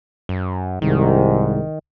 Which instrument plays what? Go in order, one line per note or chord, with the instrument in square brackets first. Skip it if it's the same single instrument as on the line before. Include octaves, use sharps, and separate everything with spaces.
[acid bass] F#2
[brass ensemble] C2 G#2 [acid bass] D#3